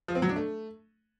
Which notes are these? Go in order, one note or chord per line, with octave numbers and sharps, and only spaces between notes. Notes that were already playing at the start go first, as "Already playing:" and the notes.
F3
C4
F#3
D4
A3